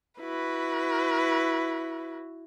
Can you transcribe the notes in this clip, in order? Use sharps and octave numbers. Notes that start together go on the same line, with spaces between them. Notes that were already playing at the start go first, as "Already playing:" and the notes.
E4 F#4 B4